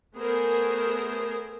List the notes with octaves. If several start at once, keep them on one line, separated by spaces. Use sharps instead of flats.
A3 B3 G#4 A#4 C5